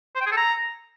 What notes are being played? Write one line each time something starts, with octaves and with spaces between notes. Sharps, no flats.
C5
G5
G#4
A4
A#5